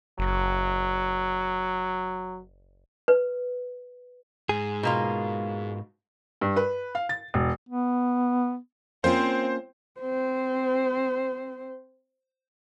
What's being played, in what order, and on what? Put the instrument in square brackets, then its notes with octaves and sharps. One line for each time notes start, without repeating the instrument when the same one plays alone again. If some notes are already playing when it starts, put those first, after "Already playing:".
[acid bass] F#1 [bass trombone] F#3
[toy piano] B4
[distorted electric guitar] G#2 [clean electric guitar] G#4
[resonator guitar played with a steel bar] B2 A#3 F4
[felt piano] G2
B4
F5
A6
E1
[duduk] B3
[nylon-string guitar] A#3 C#4 F4 [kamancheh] C4 [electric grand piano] C5
[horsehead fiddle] C4 C5